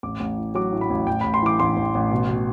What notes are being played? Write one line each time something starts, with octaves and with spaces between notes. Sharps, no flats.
A1 D6
A1
A2
F#3 D6
A2
B5
A1
A1 G5
A1 B5
C6
E3 D6
A1 C6
A1
A1
B2
B2